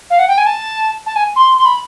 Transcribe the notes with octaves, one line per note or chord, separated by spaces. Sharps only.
F5
F#5
G5
G#5
A5
A5
G#5
C6
C6
B5